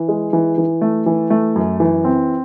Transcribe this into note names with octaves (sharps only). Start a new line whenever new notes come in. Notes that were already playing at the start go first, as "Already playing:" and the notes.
Already playing: E3
G#3
E3
E3
A3
E3
A3
F#2
E3
C4